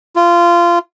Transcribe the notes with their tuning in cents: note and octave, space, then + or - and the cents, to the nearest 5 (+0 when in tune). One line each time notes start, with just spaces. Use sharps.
F4 -20